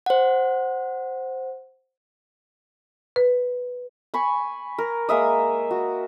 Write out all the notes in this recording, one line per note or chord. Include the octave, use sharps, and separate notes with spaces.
C5 F#5
B4
G#5 B5 C#6
A#4
G#3 A#3 E5 D#6
F#4